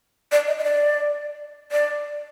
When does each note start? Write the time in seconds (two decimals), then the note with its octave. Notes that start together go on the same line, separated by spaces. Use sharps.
0.32 D5
0.47 D#5
0.59 D#5
0.64 D5
1.72 D5